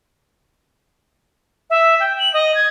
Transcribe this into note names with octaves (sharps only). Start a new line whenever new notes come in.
E5
G5
F#7
D#5
G#6